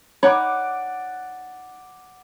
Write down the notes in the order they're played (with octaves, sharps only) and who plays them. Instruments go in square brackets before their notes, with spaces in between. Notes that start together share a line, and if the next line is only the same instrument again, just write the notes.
[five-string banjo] D#4 C#5 B5 [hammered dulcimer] D5 F#5 D6